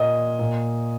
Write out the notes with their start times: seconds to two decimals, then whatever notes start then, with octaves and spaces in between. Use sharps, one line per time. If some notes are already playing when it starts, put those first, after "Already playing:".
Already playing: A#2 A#3 D#5
0.39 A#2